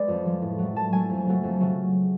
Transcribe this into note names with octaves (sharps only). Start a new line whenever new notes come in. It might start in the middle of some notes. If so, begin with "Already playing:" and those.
Already playing: G#3 B4 D5
F2
F3 G#3
A2
F#3 A3
A2 A5
F#3 A3 G#5
F2
C#3 F#3 A3
F2
C#3 F#3 A3